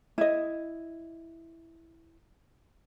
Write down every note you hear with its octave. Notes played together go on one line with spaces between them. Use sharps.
E4 D#5